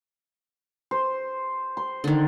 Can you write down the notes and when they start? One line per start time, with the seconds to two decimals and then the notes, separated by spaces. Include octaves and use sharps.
0.91 C5
1.77 C6
2.04 D3 D#3